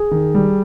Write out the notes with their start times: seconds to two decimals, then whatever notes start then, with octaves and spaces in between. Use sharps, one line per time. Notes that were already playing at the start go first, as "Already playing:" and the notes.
Already playing: G#4
0.11 D#3
0.34 G3